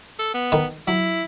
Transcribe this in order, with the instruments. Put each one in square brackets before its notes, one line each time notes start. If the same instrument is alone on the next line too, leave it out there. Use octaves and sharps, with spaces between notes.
[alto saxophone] A4
B3
[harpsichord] D#3 A#4 B4
[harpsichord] F#3 [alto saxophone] E4